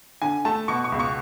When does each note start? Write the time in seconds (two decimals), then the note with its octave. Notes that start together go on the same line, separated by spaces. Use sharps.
0.22 D3 G#5
0.45 A3 A5
0.68 B2 C#6
0.84 C#6
0.92 C#2
1.00 C#6